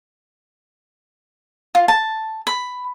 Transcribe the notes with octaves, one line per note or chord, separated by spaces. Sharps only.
F4
A5
B5